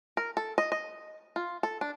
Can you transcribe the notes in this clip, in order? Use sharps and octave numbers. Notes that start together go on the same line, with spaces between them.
A#4
A4
D#5
D#5
F4
A4
D4